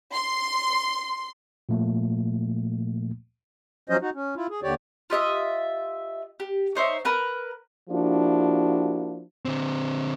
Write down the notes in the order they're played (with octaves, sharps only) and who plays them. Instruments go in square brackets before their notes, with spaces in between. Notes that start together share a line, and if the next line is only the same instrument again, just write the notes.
[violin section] C6
[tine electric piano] A#2 F3 A3 A#3
[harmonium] F3 F#3 C#4 C5 D#5
D#4 F#4
C#4
E4 F4
G#4
D#2 D3 G4 C#5 D5
[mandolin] F4 G4 D#5 E5
G4
D#4 C5 C#5 E5
A#4 B4 A#5
[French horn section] F3 A#3 D4 E4 F#4 G4
[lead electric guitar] D3 C4